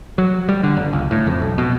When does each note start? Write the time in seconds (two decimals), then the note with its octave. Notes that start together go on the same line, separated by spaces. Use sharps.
0.18 F#3
0.49 G3
0.63 D3
0.77 G1
0.93 C#2
1.11 A2
1.27 F2
1.41 B1
1.58 B2